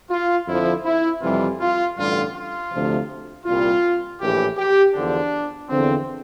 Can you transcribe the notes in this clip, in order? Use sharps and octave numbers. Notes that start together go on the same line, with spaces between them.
F4
F2 D3 F3 E4
E4
F2 C3 E3 G3 F4
F4
A1 G2 D3 G3 F4
F4
D2 C3 F3
C2 A#2 G3 F4
A#1 A2 E3 G4
G4
E2 D3 F3 D4
E2 D3 F3 C4